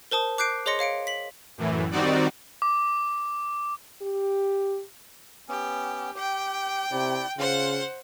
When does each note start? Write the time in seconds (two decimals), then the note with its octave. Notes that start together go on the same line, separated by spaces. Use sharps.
0.11 A#4 C5 A5 D#6
0.38 D6 F#6 G6 C7 D7
0.66 G#4 C#5 D#5 C6 A#6 C#7
0.79 C#5 F5 C#7 D7
1.07 B6 F#7
1.58 F#2 A2 E3
1.91 D#3 G3 C4 D#4 F#4 D5
2.62 D6
4.02 G4
5.48 B3 C#4 G4
6.15 G4 G5
6.91 C3 E4 G4 D5
7.38 C#3 F4 C5 F#5